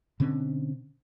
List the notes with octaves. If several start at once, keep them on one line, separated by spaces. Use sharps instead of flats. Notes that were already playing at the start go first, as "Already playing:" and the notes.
B2 D3 C4 C#4